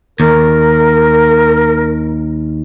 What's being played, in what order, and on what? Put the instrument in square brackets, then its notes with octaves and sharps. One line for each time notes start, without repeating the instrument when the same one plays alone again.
[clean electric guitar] D#2 [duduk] A#4